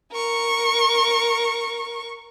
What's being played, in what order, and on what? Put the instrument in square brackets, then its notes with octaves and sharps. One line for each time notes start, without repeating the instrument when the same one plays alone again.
[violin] A#4 C#6